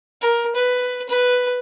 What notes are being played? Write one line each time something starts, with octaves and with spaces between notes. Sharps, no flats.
A#4
B4
B4